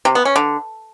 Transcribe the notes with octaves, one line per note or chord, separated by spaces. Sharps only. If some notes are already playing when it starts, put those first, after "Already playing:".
C3
B3
C#4
D3